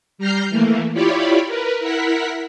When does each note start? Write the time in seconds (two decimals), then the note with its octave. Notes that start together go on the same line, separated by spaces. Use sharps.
0.18 G3 A#5 F6 G6 C7
0.50 E3 A3 A#3
0.94 E4 F4 G4 C#5 D5 B5
1.47 A#4 B4
1.80 E4 A#4 F#5 B6